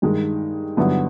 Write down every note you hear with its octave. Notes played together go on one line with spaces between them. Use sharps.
G2 D#3 G#3
G2 D3 F#3 B3 E4